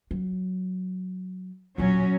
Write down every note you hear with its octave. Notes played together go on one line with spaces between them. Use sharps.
F#3
E1 A#2 F#3 C#4